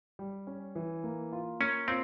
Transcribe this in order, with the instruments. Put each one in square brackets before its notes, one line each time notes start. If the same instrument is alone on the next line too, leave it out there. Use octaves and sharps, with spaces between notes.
[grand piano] G3
C#4
E3
A#3
F4
[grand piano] A#3 [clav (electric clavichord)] C#4
[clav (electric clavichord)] C4 [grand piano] F4